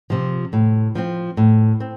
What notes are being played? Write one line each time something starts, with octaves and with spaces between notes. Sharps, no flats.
C3 F3
A2
F3 C4
A2
C4